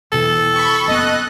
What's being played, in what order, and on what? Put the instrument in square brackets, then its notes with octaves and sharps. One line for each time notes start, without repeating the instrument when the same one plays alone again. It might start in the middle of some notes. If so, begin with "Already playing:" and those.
[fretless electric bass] E1 B2 E3 [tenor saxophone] A4
[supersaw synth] B5 C#6
[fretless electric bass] F#1 B3 [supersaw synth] D#5 F#6